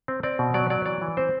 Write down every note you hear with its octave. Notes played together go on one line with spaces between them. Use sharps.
C4
C4 D5
B2
F#3 D5
F#3 D5
E3 D5
E3
C4 C5